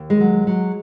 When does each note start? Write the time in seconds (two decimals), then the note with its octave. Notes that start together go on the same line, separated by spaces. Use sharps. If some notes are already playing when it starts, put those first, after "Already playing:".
Already playing: D#2
0.10 G#3
0.20 F#3
0.47 F#3